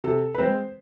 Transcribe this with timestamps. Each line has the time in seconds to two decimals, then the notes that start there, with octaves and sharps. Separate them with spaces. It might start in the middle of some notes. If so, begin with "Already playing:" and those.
0.04 C3 A4
0.35 B4
0.38 G#3 C4 C5